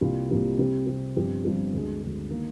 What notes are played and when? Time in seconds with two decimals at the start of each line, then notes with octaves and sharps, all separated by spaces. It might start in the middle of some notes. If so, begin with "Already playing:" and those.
0.01 C2 C3 G3 A#3 F4
0.29 C2 C3 G3 A#3 F4
0.58 C3 G3 C4
0.87 C3 G3 C4
1.16 G1 G2 F3 C4 G4
1.45 G1 G2 F3 C4 G4
1.74 D2 D3 G#3
2.03 D2 D3 G#3
2.30 D#3 A#3